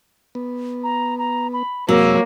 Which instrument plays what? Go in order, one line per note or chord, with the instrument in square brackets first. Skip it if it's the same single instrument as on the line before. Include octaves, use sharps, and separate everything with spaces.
[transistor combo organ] B3
[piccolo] A#5
A#5
B5
[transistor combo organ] F#2 C3 G#3 [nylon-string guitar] F#3 [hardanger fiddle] A#3 [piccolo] E6